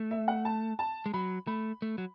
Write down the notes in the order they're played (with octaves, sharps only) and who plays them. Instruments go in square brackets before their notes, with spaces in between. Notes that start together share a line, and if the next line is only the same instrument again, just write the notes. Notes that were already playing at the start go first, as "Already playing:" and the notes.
Already playing: [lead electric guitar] A3
[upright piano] E5
F#5
A5
A5
[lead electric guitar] G#3
[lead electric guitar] F#3 [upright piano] B5
[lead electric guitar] A3 [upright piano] B5
[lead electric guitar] A3
F#3